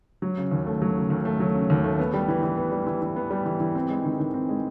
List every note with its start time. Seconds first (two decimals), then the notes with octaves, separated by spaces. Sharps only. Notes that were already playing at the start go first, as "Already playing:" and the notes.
0.22 F#3
0.37 C#3
0.51 D#2
0.66 A3
0.82 F#3
0.96 C#3
1.10 D#2
1.25 A3
1.40 F#3
1.54 C#3
1.70 D#2
1.84 A3
1.99 B3
2.13 G3
2.28 E3
2.43 E3
2.58 B3
2.72 G3
2.87 E3
3.02 E3
3.16 B3
3.31 G3
3.45 E3
3.60 E3
3.75 C4
3.90 G#3
4.04 D#3
4.19 D#3
4.34 C4
4.49 G#3